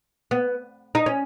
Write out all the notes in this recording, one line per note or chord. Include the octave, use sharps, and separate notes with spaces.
B3
D#4
C#4